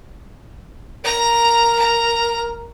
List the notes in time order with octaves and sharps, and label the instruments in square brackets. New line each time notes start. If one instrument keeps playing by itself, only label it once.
[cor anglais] A#4 [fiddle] A#5
[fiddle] A#5